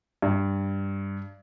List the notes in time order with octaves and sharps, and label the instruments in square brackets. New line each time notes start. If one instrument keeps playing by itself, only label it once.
[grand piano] G2